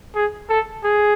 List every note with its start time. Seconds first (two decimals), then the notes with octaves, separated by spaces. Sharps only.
0.15 G#4
0.49 A4
0.83 G#4